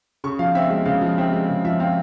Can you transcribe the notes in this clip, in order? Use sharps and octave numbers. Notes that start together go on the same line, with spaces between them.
C#3 C#6
F3 F5
C4 E5
G#3 E5
C#3 F5
F3
C4 E5
G#3
C#3
F3 E5
C4 F5